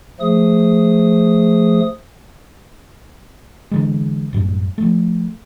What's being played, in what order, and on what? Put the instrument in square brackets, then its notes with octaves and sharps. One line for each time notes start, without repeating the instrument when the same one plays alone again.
[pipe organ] F3 A3 G#4 D#6
[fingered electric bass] D3 E3 G#3
A1 F#2 G3
F3 A3